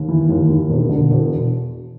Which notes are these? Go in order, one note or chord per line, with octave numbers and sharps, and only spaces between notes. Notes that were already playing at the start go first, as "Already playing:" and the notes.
Already playing: D#2
E3
D#2
D#2
E1
D3
E1